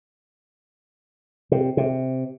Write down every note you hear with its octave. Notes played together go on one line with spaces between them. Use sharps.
C3
C3